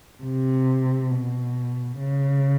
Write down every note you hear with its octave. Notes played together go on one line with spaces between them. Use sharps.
C3
B2
C#3